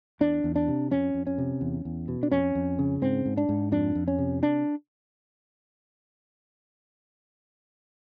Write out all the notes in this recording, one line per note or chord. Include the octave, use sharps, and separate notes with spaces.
E2 D4
E2
D4
C3
F2 C#4
F2
C#4
C3
E2
E2
B2
D4
F2 C#4
F2
C#3
G#2 C4
G#2
D4
G#2
F2 D4
F2
C#4
C3
D4